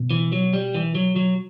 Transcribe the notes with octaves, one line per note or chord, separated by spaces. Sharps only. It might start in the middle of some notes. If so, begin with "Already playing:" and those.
Already playing: B2
E3
F#3
G3
E3
F#3
F#3